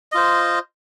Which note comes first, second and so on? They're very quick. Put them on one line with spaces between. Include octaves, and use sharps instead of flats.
D#5 F4 C5